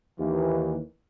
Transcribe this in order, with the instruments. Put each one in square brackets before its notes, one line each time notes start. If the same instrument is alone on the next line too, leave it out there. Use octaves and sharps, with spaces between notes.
[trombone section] D#2 E3